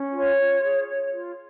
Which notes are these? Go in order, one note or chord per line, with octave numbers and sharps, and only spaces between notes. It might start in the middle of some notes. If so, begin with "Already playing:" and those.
Already playing: C#4
F4 C#5
F4
G#4
C#5
F4